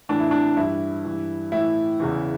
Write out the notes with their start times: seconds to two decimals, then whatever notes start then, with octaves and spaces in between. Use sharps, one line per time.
0.09 A2 E3 D4
0.20 E4
0.31 D4
0.57 G2 E3 E4
1.04 G2 E3
1.52 A2 E3 E4
2.00 E2 C#3 E3